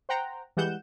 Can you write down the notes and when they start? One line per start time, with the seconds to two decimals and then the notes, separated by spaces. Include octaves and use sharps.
0.09 C5 F#5 G5 A#5
0.57 E3 G3 G#3 F#5 G6 E7